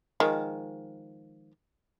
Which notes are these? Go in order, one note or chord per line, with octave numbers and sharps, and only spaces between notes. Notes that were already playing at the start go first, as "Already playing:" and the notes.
D#3 F3 G#3